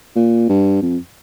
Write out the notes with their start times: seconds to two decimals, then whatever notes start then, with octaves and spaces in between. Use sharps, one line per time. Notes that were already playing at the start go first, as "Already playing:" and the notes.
0.16 A#2
0.49 G2
0.82 F2